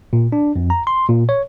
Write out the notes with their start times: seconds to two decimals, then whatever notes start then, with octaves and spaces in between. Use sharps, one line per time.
0.13 A#2
0.32 D4
0.56 F2
0.70 A#5
0.87 C6
1.09 A#2
1.29 C#5